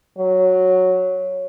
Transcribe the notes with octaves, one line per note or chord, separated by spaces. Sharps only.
F#3